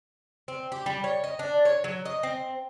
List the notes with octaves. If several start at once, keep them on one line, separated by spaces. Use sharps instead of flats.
C4
G4
G3
C#5
D#5
D4
C#5
F#3
D#5
C4